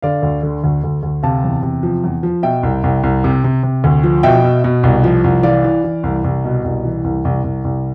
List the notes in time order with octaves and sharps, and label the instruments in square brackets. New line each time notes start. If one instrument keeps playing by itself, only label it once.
[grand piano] D3 D5 F5
D2
D3
D2
D2
D2
C3 F5 A5
E2
C3
F3
E2
F3
B2 E5 G5
C2
C2
C2
C3
C3
C3
D2
F3
B2 E5 G5
B2
B2
C2
F3
C2
E3 D5 F5
E3
E3
C2
C2
B2
C2
E3
C2
C2
C2
C2